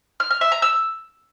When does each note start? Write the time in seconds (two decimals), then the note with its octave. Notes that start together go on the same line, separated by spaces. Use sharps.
0.20 F6
0.31 F6
0.41 E5
0.52 A#5
0.62 E6